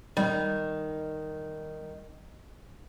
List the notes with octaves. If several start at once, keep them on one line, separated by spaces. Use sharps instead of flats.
D#3 G3